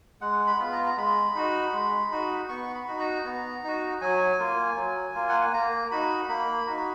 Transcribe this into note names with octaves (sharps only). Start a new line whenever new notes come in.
G#3 F#5
B5
B3 F4
A#5
A#5
G#3 B5
D#4 F#4
G#3
D#4 F#4
B3 C#6
B5
D#4 F#4
A#5
B3
D#4 F#4
F#3 G#5
A#3 F4
F#3
A#3 F4
F#5
G#5
A#3 A#5
D#4 F#4 B5
A#3 B5
D#4 F#4